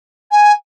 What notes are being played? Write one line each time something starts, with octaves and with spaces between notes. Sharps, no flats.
G#5